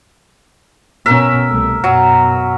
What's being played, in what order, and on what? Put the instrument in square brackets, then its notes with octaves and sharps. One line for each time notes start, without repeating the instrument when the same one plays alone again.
[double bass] B2 C#4 [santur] A#4 E5
[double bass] C2 A3
[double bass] F#2 B2 [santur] F#3